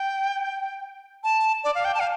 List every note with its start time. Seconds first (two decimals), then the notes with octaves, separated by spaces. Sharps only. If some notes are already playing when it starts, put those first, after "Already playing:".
Already playing: G5
1.24 A5
1.64 D5
1.75 F5
1.85 G5
1.95 A5
2.00 F5